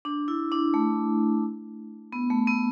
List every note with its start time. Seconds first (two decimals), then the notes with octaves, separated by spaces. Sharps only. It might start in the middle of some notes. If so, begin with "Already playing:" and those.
0.05 D4
0.28 E4
0.52 D4
0.74 A3
2.13 B3
2.30 A3
2.47 B3